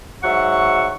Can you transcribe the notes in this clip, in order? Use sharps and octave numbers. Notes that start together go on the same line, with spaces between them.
G#2 F#3 E5 F#5 C#6